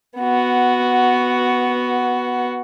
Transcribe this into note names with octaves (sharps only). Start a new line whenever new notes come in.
B3 F#4